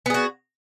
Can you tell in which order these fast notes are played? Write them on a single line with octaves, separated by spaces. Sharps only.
B3 G#4 F#4